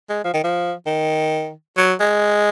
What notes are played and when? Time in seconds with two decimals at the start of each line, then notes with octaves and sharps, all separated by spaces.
0.10 G#3
0.24 F3
0.34 D#3
0.44 F3
0.87 D#3
1.77 F#3
2.00 G#3